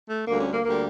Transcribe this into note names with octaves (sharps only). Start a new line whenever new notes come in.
A3
D2 D3 G3 A#3
C#4
A#3
D2 D3 G3 A#3